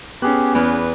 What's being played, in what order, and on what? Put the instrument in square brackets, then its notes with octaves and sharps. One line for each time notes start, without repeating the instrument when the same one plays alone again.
[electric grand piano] B3 [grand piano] C#4 G#4 F#6 [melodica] G4
[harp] E2 [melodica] B4